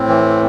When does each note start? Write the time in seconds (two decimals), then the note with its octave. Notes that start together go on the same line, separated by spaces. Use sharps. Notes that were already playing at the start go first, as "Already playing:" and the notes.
Already playing: A2 C4
0.08 E3